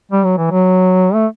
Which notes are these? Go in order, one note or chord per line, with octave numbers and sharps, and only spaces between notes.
G3
F#3
E3
F#3
A3